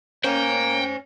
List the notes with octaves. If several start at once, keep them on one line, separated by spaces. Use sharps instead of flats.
A#3 C#4 C5 G5 G#5